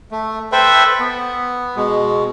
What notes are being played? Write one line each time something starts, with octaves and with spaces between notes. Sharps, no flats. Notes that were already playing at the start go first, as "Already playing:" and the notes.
A3
A4 B4 C5 E5 G5 B5
B3
B2 G#3